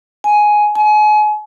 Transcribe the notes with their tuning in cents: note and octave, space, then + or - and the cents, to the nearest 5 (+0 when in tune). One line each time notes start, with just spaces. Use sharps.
G#5 +10
G#5 +35